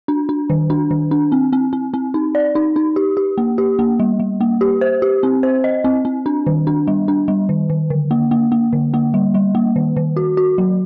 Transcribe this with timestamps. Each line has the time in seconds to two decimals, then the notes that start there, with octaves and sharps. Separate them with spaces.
0.08 D4
0.29 D4
0.50 D#3
0.70 D4
0.91 D#3
1.11 D4
1.32 C4
1.53 C4
1.73 C4
1.94 C4
2.14 D#4
2.35 D5
2.55 D#4
2.76 D#4
2.96 G4
3.17 G4
3.38 A#3
3.58 G4
3.79 A#3
4.00 G3
4.20 G3
4.41 A#3
4.61 G4
4.81 C5
5.02 G4
5.23 C4
5.43 C5
5.64 D#5
5.84 C4
6.05 C4
6.26 D4
6.47 D#3
6.67 D4
6.88 G3
7.08 D4
7.28 G3
7.49 D#3
7.70 D#3
7.90 D3
8.11 A#3
8.31 A#3
8.52 A#3
8.73 D3
8.94 A#3
9.14 G3
9.34 G3
9.55 A#3
9.76 D#3
9.97 D#3
10.17 F#4
10.37 F#4
10.58 F#3